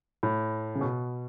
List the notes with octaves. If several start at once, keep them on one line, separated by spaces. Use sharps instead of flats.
A2
C#3
B2